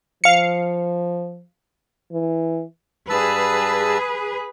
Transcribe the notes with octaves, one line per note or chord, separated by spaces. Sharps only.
F3 F5 C#7
E3
G2 G#4 B4 A5 E6